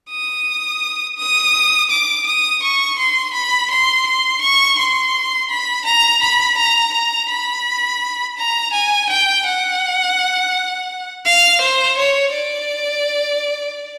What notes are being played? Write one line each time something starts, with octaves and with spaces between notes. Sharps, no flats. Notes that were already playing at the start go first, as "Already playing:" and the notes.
D#6
D#6
D6
D#6
C#6
C6
B5
C6
C6
C#6
C6
B5
A#5
B5
A#5
A#5
B5
A#5
G#5
G5
F#5
F5
C5
C#5
D5